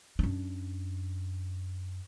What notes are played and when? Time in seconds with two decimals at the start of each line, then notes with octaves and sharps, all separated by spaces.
0.19 F#2 D4